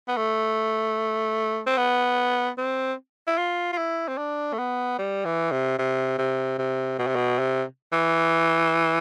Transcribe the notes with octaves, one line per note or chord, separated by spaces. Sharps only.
B3
A3
C4
B3
C4
E4
F4
F4
E4
C4
D4
A3
B3
G3
E3
C3
C3
C3
C3
B2
C3
B2
C3
E3